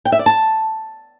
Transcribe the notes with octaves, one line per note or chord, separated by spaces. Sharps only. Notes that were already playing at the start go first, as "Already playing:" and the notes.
G5
E5
D5
A5